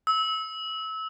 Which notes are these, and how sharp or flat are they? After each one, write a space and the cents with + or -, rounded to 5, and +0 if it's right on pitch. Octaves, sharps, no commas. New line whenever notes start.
E6 -25